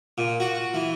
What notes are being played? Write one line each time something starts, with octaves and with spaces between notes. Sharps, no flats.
A#2
F#4
E3